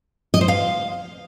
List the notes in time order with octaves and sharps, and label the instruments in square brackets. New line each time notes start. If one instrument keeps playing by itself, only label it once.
[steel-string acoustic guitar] D#5
C5
F5